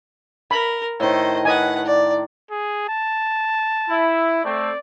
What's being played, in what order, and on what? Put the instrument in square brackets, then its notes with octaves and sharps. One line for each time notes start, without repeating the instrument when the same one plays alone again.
[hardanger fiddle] A#4 [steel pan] B5
[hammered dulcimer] A2 D#3 [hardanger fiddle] C5 D#5
[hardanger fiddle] B4 F#5 [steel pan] D#5 G#5
[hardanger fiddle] D5
[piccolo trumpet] G#4
A5
[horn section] E4
[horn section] A3 C4 [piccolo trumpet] D5